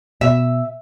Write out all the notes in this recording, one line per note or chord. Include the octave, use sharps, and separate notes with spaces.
B2 E5